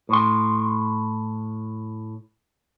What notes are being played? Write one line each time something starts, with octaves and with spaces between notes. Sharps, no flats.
A2 C6